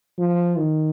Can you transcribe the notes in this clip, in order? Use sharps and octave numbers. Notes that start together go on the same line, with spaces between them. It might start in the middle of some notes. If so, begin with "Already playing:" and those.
F3
D#3